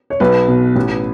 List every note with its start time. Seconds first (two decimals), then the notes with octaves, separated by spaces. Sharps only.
0.10 C#5
0.20 B1 B4
0.48 B2
0.76 A1